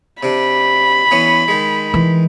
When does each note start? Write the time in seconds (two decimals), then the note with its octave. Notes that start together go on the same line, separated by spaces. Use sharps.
0.23 C3 D4 B5
1.11 E3 B3 C#4
1.48 D#3 G#3
1.94 E3